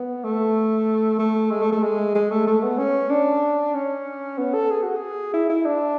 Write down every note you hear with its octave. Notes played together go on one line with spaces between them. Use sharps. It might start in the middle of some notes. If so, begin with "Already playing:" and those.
Already playing: B3
A3
A3
G#3
A3
A3
G#3
G#3
A3
A3
B3
C#4
D4
C#4
B3
A4
G#4
F#4
G#4
E4
E4
D4